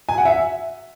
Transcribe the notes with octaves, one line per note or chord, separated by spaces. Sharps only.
G#5
F#5
E5